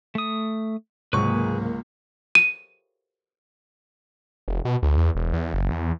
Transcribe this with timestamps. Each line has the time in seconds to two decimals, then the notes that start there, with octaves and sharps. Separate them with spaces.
0.15 A3 D#6
1.13 C#2 G#2 C3 F#3 A#3 G#4 B4 C#6
2.35 D#7
4.48 F1
4.65 B2
4.83 D2
4.97 E2
5.15 E1
5.33 E2
5.54 F#1
5.70 E2